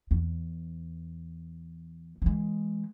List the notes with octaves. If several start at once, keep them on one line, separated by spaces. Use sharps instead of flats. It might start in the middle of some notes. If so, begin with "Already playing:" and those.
E2
E3 G#3